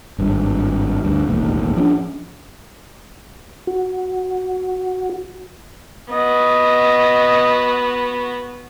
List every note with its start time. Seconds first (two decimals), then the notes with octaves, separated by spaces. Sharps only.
0.19 G#1 G2
1.05 D2 G2
1.28 E1 A1 D#2
1.76 F3 C#4 D4
3.67 F#4
6.12 B3 F#4 D#5